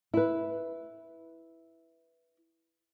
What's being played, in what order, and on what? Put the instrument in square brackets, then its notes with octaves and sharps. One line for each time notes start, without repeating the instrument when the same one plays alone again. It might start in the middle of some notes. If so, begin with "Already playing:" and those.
[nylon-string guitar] E4 B4